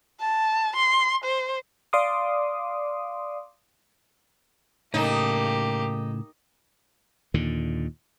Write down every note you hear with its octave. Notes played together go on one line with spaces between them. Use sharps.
A5
C6
C5
D5 F5 C6 D6 D#6
A2 C#3 A#3 D#4 G4 A4
D#2 A#2 D3